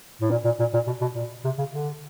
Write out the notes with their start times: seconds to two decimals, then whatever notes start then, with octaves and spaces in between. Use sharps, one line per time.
0.21 A2
0.31 A#2
0.45 A#2
0.59 A#2
0.73 A#2
0.87 B2
1.01 B2
1.15 A#2
1.44 C3
1.58 C#3
1.72 D3